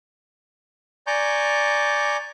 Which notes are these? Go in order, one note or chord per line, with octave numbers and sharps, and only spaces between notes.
D5 G#5 A#5 C#6 D6 G6